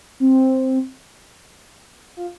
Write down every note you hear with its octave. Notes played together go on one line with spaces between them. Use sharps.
C4
F4